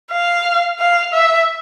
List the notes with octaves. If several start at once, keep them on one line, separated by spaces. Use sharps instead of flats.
F5
F5
E5